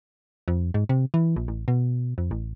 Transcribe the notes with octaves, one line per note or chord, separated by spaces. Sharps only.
F2
G#2
C3
E3
A#1
A1
B2
F2
A1